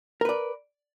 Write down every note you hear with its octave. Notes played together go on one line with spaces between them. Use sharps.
A#4 B4 D5